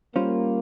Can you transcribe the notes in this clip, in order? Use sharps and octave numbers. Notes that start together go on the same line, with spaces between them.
G3 A#3 C#4 F4 C5